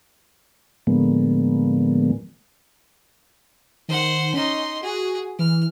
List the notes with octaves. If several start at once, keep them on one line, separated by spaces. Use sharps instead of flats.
A2 D3 F3 G#3 A#3 B3
D#3 C5 F#5
C#4 D#4 C6
F#4 G#4
E3 F6